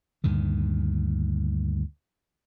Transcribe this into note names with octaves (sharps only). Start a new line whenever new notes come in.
D2 G2 A#2 D#3